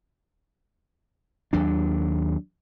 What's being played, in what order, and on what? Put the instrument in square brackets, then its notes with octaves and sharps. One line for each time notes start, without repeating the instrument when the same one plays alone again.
[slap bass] D#2 F#3 D4